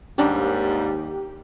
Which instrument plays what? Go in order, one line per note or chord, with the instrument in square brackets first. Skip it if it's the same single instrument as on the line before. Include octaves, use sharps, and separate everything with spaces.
[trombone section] D#2 [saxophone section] G#2 G3 [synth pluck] C#4 D4 [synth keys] G4